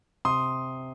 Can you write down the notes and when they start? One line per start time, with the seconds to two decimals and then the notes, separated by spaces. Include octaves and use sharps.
0.25 C3 C6 D#6